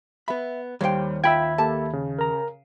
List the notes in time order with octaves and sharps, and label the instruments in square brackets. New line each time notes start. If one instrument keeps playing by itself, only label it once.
[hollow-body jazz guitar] B3 B5 [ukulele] E5
[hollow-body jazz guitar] D#2 C5 [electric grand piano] G3 [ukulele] C#5 G5
[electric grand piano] F4 F5 [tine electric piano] E5 B5 G#6 [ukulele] G5
[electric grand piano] A#3 G4 A4 [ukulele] A5
[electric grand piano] C#3
[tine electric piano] A#4 A#5